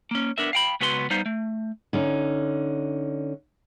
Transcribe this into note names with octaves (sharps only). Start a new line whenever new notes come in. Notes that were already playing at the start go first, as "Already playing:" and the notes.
A#3 C#4
B3 D4 A#4 E5
F5 G5 B5
C#2 B3 F#4 B4 A#5 C6
G3 B3 D#4 C5 F5
A3
D3 C#4 D#4